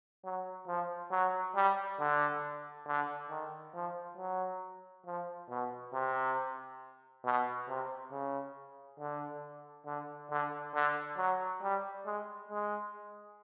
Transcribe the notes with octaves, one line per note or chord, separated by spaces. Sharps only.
F#3
F3
F#3
G3
D3
D3
D#3
F3
F#3
F3
B2
C3
B2
C3
C#3
D3
D3
D3
D3
F#3
G3
G#3
G#3